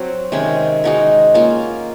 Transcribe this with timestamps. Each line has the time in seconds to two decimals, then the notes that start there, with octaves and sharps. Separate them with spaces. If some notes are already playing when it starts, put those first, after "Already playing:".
Already playing: F#3 C4 F#4
0.32 C3 D#3 G#3 C#4
0.84 G#3 D#4 F#4 A#4
1.34 A#3 C#4 F4